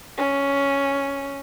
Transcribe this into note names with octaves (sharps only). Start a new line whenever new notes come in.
C#4